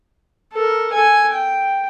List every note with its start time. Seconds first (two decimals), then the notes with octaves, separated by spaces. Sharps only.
0.53 A4 A#4
0.93 A4 G#5
1.33 G5